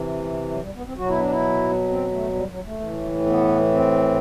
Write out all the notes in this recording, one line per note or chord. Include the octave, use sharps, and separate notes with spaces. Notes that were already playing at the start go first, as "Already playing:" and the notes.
Already playing: C3 E3
F#3
G3
B3
C4
B2 F#3 F#4
E4
D4
E4
C4
A3
G3
F#3
A3
A2 E3
B3
C4